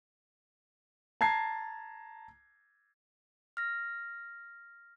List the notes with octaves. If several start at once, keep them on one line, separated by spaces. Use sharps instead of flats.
A5 A#5 G#6 C7
F6 A#6